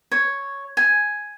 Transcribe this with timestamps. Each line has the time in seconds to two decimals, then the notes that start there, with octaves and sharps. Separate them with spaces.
0.12 C#5
0.77 G#5